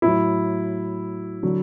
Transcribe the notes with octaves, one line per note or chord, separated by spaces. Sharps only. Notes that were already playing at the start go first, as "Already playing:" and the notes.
A2 F#3 E4
D3 F#3